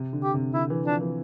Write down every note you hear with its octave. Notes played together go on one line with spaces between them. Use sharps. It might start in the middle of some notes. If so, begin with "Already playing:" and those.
Already playing: C3
D3
G4
C3
D3 E4
E3
F3 D4
E3